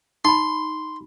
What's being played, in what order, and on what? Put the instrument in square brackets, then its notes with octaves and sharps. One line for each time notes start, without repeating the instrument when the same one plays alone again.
[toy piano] D#4 B5 [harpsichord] C6